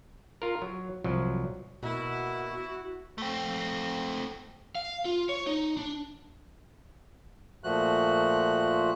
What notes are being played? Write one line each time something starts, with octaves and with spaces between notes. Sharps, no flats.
F4 A#4
F#3
C2 F3 F#3
B2 A#3 E4 F#4
A3 C4
F5
F4
C#5
D#4
D4
A#2 F3 A3 F#4 F#6